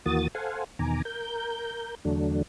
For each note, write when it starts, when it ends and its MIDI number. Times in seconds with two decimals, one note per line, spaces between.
0.06 0.28 39
0.06 0.28 52
0.06 0.28 58
0.06 0.28 66
0.06 0.28 87
0.06 0.28 93
0.35 0.64 69
0.35 0.64 72
0.35 0.64 77
0.35 0.64 78
0.35 0.64 80
0.79 1.02 40
0.79 1.02 47
0.79 1.02 51
0.79 1.02 80
0.79 1.02 82
0.79 1.02 86
1.05 1.95 70
1.05 1.95 91
2.05 2.42 40
2.05 2.42 50
2.05 2.42 54
2.05 2.42 57
2.05 2.42 62